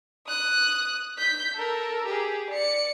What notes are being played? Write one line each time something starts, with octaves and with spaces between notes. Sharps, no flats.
D#6 F#6
G6 B6
A4 A#4
G4 G#4
D5 C#7